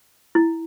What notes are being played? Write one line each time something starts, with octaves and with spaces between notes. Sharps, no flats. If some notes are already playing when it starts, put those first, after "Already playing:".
E4